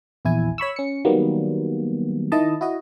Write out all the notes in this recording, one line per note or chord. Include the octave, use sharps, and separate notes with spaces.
A#1 E2 E4 G#5
C#5 B5 C#6 E6
C#4 C#7
D#3 F#3 G3 A#3 B3
D#3 E4 D#5 A5
E4 F#4 D#5